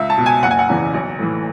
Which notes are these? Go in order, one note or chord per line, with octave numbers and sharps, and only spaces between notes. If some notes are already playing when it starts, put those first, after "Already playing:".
Already playing: C#2 E5
A5
B2
G#5
F#1 F#5
G#5
F#5
E2 C#3 E3
B1
A2 E3